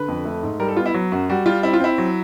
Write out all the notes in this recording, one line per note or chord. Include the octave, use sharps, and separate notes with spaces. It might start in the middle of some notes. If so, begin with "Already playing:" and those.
Already playing: D3 B4
F2
A3
G#2
G3 A#4
A4
B3 F4
E4
F#3
F#2 F#4
G3 F#4
G3 F4
C4 E4
F4
C4 E4
F#3